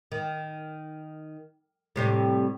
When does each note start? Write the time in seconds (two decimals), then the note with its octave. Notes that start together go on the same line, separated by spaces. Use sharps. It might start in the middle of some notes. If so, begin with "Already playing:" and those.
0.12 D#3
1.96 A2 C3 G3